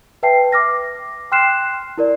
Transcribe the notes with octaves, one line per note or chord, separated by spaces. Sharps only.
B4 E5 G5 A5 C7
D6 F6 A#6
G5 C6 F6 F#6 C7 E7
E4 A#4 D5